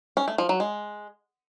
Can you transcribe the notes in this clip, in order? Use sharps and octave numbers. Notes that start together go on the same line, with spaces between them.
C#4
A3
F3
F#3
G#3